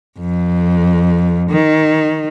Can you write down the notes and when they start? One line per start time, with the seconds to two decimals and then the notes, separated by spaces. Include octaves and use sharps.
0.19 F2
1.50 D#3